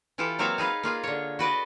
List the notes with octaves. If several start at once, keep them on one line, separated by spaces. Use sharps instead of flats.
E3 E4 F4 G4 A4
F#3 A#3 C4 C#5 E5 F5
D#4 G#4 B4 F5
A#3 F4 G#4
D3 C#5
F#4 B4 D5 D#5